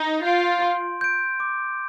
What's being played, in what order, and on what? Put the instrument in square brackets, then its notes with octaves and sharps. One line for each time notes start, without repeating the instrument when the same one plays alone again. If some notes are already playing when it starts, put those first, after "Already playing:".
Already playing: [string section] D#4
[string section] F4 [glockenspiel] G6 D7
[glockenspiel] C6
G6 D7
D6